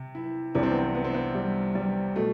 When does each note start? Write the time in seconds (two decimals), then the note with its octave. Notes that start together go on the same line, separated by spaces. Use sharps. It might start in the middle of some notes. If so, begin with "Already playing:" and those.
Already playing: C3
0.15 E4
0.55 C2 C3 E3 D4
0.63 C4
0.71 B3
0.79 C4
0.95 B3
1.05 C4
1.14 B3
1.35 G3
1.75 G3
2.16 B2 A3